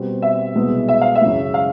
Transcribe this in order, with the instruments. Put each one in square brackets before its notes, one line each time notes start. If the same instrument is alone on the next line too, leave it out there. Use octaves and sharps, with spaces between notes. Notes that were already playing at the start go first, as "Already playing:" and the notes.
Already playing: [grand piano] B2 G3 C4
[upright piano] E5
[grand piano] C2 B2 G#3 B3
[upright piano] E5
F5
E5
[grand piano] F#2 C#3 E3 G#3
[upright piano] F5